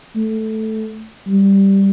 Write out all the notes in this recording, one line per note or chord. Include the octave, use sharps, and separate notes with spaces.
A3
G3